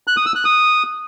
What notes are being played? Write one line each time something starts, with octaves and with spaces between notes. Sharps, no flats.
F#6
D#6
E6
F#6
D#6